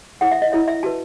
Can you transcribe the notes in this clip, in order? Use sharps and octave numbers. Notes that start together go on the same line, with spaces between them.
E4 A4 C#5 F#5
E5
D#5
E4 A4 C#5 E5
E5
F#4 B4 A5